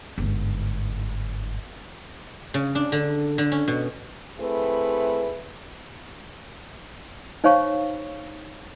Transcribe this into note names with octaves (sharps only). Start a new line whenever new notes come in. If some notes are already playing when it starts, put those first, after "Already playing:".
G1 G#2
C#3
D4
D3
D3
C#4
B2
A3 C4 E4 G#4 B4
D#4 C5 C#5 F5 C#6